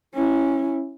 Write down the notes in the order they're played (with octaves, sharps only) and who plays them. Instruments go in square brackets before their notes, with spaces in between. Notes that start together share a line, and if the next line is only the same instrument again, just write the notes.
[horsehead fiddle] C#4 E4